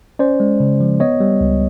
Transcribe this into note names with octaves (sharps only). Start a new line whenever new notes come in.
C#4 C5 D5
G#3
C#3
F3
B3 C#5 D#5
G3
C#2